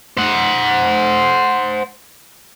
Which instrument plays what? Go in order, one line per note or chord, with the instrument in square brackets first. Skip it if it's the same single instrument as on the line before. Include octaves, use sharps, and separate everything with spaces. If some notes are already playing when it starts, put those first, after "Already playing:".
[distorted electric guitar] C5 F#5